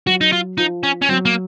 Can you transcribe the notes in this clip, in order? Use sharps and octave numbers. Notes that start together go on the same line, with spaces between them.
F#3 F#4
D#4
F4
F3 D#4
C#4
C#4
F#3 C4
A#3